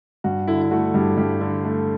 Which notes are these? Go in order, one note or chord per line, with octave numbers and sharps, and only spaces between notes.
G2 F#4
D3 E4
E4
A3 F#4
G2 G4
G2 G4
D3
A3